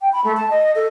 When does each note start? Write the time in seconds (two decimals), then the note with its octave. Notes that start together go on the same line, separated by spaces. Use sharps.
0.01 G5
0.12 B5
0.24 A3
0.37 A5
0.50 D#5
0.75 A4